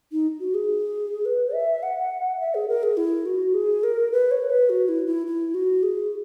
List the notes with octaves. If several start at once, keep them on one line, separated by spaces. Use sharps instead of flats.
D#4
F#4
G#4
B4
E5
F#5
E5
G#4
A#4
G#4
E4
F#4
G#4
A#4
B4
C#5
B4
F#4
E4
E4
E4
F#4
G#4